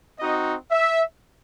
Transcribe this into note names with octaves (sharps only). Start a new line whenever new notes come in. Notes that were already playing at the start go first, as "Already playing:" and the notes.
C4 D#4 F#4 D#5
E5